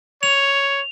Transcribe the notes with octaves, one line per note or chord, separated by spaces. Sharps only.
C#5 F7